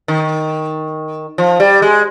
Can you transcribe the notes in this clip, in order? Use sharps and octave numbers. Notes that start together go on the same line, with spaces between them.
D#3
F3
G3
G#3